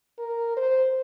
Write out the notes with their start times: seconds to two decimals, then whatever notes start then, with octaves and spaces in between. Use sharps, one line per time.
0.19 A#4
0.57 C5